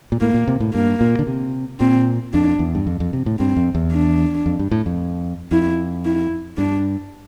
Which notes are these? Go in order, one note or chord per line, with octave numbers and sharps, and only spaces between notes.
A#2
A2 A#3
A#2
C3
A2
G2 A#3
A#2
D3
C3
A#2 C4
F2 D4
E2
G2
F2
F2
C3
A2
G2 C4
F2
E2
D4
F2
G2
A2
F2
F2 E4
E4
G2 D4